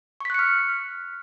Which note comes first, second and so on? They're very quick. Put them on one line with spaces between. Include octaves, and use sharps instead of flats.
C#6 B6 F#6 C#7 F6